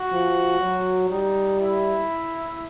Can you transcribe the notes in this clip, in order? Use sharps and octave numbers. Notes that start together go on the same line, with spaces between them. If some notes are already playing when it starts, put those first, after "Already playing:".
Already playing: F#4
F3
F#3
G3 D#4
E4